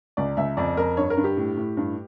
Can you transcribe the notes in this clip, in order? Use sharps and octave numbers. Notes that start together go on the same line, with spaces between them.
C#2 D5
C#2 E5
F2 D5
F2 A#4
G2 C#5
A#4
G2
G4
A2
A2
G2